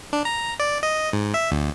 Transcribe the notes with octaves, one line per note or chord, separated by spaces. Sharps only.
D4
A#5
D5
D#5
G#2
E5
D2